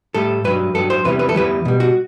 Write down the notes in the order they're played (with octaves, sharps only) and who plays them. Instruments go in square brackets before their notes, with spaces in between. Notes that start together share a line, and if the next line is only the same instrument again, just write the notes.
[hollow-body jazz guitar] A2 G3 A4
G2 F#3 B4
G2 F#3 A4
C5
E2 C3 E3 G3 B4
B4
A4
E2 C3 E3 G3 B4
B2 G3
F#4